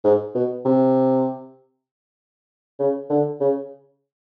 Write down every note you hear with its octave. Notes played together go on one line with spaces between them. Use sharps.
G#2
B2
C3
C#3
D3
C#3